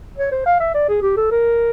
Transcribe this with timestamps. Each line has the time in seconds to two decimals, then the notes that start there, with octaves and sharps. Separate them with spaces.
0.18 C#5
0.32 C5
0.46 F5
0.60 E5
0.74 D5
0.88 G#4
1.02 G4
1.17 A4
1.31 A#4